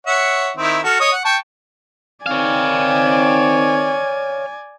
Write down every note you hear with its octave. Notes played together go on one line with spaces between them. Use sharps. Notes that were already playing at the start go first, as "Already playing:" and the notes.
C#5 E5 F#5
D#3 C4 E4
F#4 A4 F6
C#5 D#5 D#6
F#5
G5 A5 C#6
D#3 C4 C#5 D5 F5 G#5